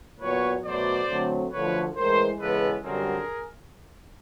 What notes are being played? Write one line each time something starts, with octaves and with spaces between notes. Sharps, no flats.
A#2 F#3 B3 B4 C#5
B2 F#3 A3 C5 D5
D3 F#3 A3 C4
F#2 D3 F3 A3 B4 C#5
A2 E3 G#3 A#4 C5
C#3 E3 G#3 B3 A4 B4
F#2 D3 G3 C4 G#4 A#4